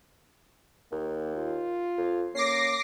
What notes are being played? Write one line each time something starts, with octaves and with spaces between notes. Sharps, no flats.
D#2 A#3
F4
F2
A#3 C#4 D6 A#6 C7